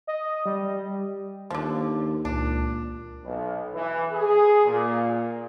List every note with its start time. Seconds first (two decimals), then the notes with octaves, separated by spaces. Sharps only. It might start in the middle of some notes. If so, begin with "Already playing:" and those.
0.07 D#5
0.46 G3
1.50 D#2 D3 F3
2.25 C#2 A#2 D4
3.24 B1
3.74 E3
4.12 G#4
4.66 A#2